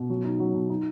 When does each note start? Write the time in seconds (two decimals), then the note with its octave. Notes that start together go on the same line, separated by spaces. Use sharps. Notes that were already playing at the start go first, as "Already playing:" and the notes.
Already playing: B2
0.10 F#3
0.24 D#4
0.40 F#3
0.54 B2
0.70 D#4